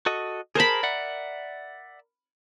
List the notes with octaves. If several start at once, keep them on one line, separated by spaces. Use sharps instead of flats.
F#4 A4 D#5
G#4 A#4 C5 A5 B5
D5 E5 F#5